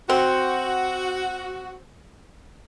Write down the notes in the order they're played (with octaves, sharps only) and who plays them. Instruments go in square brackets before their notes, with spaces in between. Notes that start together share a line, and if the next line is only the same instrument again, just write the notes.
[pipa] C4 [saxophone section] F#4